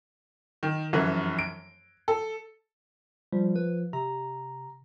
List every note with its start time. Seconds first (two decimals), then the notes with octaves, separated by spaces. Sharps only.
0.63 D#3
0.93 F1 F#2 E3
1.39 D7
2.08 A4
3.33 F3 G3
3.56 B4
3.93 C3 A#5